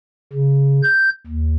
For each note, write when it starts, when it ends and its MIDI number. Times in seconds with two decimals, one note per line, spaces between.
0.33 0.81 49
0.83 1.10 91
1.27 1.57 39